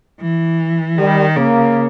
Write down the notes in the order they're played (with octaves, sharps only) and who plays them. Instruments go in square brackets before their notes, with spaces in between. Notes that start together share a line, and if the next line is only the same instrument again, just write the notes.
[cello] E3
[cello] D#3 [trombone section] G3
[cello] C#3 [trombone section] A#3